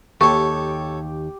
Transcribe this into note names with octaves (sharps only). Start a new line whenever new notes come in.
D#2 G4 A4 C#5 C#6